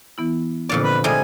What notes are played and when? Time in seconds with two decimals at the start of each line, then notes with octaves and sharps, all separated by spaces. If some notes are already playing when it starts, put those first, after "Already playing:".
0.18 E3 B3 E4
0.69 F2 A#2 D3 D4 F4 D5
0.82 B4
1.04 C3 G3 G#3 A4 G#5 D#6